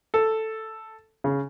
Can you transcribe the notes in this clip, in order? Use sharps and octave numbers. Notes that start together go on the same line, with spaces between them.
A4
C#3